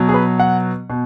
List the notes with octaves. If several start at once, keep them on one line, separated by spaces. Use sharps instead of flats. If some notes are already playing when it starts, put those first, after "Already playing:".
Already playing: B2 F#3
G#4
B4
F#5
B2